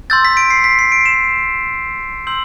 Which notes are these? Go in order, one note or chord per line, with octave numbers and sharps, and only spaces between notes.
C6 E6 G6 A6
B6
D7
C7
B6
C7
D7
E7
C6 E6 G6 F#7